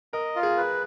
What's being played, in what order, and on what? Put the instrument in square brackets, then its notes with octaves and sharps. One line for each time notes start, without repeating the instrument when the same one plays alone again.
[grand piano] A#4 [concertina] D#5
[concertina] F4
[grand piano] G#4
[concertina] B4